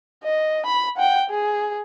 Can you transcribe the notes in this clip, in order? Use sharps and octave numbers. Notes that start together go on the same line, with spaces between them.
D#5
B5
F#5 G5
G#4